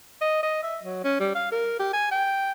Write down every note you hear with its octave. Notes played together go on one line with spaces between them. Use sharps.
D#5
D#5
E5
F#3
C#4
G3
F5
A#4
G4
G#5
G5